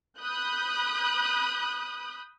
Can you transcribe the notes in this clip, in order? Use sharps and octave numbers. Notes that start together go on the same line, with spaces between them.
B5 D#6 F#6 G6